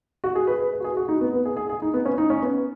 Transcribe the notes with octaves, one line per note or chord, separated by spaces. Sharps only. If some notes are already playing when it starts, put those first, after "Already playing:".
F#4
G#4
B4
G#4
B4
F#4
G#4
F#4
D#4
B3
B3
G#4
G#4
G#4
D#4
B3
C#4
D#4
C#4
B3